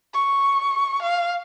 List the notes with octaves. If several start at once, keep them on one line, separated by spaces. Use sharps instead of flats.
C#6
F5